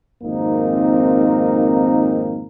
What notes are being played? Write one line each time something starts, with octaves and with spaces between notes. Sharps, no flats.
G#1 F2 A#3 C4 D#4 A#4